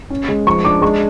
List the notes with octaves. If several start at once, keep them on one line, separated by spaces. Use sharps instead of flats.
C#4
G#3
F3 C#6
D4 D6
G#3 C#6